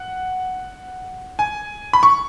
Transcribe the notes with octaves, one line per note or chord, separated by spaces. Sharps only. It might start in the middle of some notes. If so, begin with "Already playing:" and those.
Already playing: F#5
G#5
B5
C#6